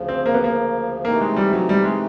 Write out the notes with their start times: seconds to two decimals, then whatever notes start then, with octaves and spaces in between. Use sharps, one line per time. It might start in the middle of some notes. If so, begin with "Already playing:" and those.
Already playing: D2 C#3 F3
0.09 C4
0.26 A#3
0.34 B3
0.44 A#3
1.05 C3 E3 A3 A#3 C4 D#4
1.21 G#3
1.36 G3
1.53 F#3
1.69 G3
1.84 G#3